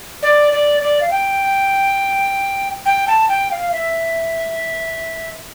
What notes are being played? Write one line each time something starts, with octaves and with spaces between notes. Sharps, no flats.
D5
D5
D5
F5
G5
G5
A5
G5
F5
E5